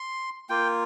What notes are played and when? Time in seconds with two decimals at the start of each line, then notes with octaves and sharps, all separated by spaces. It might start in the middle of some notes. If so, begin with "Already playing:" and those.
Already playing: C6
0.50 A#3 F4 G5